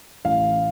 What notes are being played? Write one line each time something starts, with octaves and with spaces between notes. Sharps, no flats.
A1 F5